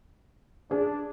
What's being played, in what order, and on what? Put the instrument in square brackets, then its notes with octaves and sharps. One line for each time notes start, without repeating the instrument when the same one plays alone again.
[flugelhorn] D4 [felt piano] G#4